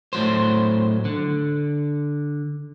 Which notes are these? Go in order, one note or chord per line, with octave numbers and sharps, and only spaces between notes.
A2 F#3 C5
D3